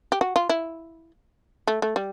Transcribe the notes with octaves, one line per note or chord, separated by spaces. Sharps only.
G4
F#4
F4
E4
A3
A3
G3